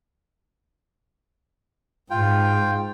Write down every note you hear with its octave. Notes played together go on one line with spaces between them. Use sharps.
G#2 F4 G5